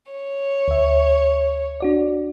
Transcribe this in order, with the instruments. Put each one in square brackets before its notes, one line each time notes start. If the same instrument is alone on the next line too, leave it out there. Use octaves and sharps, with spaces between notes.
[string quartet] C#5
[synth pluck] D2 E5
D4 F#4 D5